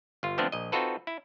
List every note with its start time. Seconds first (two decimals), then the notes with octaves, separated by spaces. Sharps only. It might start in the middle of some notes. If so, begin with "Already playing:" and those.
0.23 G1 F4
0.38 D3 F3 A3 B3 C4 D4
0.52 A#1 D#5
0.72 C4 D#4 F4 F#4 A4 B4
1.07 E4